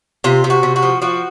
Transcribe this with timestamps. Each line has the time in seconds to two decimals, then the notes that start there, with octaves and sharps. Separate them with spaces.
0.24 C3 F4
0.44 C3
0.50 F#4
0.63 C3
0.76 F#4
0.82 F3
1.02 F3 F#4